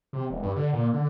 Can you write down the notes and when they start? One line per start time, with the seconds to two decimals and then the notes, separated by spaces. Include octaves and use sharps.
0.13 C3
0.30 E1
0.43 G2
0.56 D3
0.73 A#2
0.93 D3